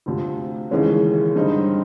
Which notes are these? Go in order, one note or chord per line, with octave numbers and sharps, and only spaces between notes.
D2 C3 F3
D#2 C#3 E3 G#3 C#4
G2 D3 G3 C4 D#4